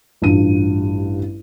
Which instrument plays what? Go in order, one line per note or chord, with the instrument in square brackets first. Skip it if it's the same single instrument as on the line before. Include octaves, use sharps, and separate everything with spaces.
[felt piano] A1 G2 F4 D#7